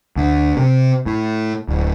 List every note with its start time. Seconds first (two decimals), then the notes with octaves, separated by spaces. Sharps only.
0.16 D2
0.57 C3
1.06 A2
1.69 D1